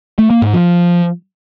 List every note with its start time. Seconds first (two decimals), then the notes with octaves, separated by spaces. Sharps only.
0.19 A3
0.30 A#3
0.42 G#2
0.54 F3